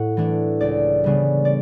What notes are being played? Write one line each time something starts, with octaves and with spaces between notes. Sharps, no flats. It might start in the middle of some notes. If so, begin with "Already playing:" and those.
Already playing: A2 F#5
E3 A3 D4
C#2 D5
C#3 G3 B3 D4
D5